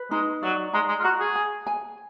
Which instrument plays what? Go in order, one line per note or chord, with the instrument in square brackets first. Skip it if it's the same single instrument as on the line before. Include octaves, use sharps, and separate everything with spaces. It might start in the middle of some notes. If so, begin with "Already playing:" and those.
Already playing: [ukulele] B4
[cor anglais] G#3 [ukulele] D#4
[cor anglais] F#3 [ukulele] D5
[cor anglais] G#3 [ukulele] A#5
[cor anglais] G#3
F4
[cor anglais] F#4 [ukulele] A#5
[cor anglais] G#4
[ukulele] G#5
G#5